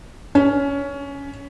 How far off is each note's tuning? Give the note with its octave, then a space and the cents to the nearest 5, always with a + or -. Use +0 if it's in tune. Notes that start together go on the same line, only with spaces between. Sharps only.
C#4 +15